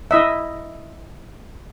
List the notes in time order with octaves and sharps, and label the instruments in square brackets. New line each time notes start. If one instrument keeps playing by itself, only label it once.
[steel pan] E4 D#5 E5